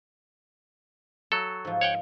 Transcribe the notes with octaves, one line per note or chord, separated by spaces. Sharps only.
F#3 F#4 A4
G#2 F3
C#5 F#5 G5